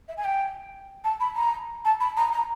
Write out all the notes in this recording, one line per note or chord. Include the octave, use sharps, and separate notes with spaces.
E5
G#5
G5
A5
B5
A#5
A5
B5
A#5
A#5